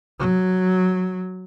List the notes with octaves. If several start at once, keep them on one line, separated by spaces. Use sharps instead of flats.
F#3